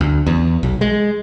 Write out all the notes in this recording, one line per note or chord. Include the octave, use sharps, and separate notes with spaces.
D2
E2
B1
G#3